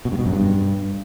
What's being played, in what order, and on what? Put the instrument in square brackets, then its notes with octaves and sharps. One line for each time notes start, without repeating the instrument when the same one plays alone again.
[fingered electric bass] B2
G2
B2
F#2
G2